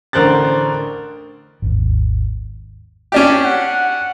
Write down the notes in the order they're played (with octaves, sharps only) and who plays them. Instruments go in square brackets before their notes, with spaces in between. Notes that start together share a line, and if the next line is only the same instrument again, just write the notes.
[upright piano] A1 D3 A#4 C5 F#6 A6
[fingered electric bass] G#1 D#2
[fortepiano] C#4 D4 G4
[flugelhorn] F#5